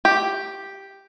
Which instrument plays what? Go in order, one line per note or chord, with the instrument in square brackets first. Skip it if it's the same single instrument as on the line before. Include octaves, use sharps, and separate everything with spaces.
[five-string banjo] G4